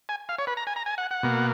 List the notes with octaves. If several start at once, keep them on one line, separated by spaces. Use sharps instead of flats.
G#5
F5
C#5
B4
A#5
G#5
A#5
G#5
F#5
F#5
B2 A#3